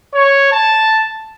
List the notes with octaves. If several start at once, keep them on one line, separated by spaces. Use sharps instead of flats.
C#5
A5